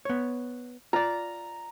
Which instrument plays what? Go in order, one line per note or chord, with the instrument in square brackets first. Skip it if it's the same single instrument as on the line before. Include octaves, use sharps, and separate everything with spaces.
[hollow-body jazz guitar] B3 C#5
[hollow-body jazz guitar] F4 D5 [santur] A#5